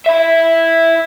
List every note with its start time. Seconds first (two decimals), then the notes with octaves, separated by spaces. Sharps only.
0.06 E4 E5